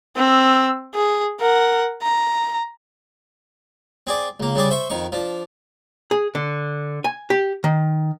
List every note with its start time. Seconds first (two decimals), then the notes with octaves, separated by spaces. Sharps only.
0.17 C4 E6
0.95 G#4
1.40 A#4 F#5
2.03 A#5
4.07 C4 G#4 D5
4.40 C#2 A#3
4.55 C#3 G3 G#4 D5
4.71 C5 E5 C6 C#6
4.90 F2 D#3 C#6
5.12 F3 D4
6.11 G#4
6.35 D3
7.04 G#5
7.30 G4
7.64 D#3